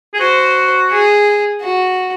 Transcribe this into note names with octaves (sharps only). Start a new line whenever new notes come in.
G#4
F#4 C5
G#4
F#4